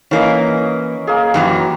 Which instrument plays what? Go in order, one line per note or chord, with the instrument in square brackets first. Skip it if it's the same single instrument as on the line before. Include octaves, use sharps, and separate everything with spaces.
[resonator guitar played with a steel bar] E3 A#3 [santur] C#4 D#5
[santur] A#3 G#4
[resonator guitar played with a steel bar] F#2 E3 F#3 [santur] G4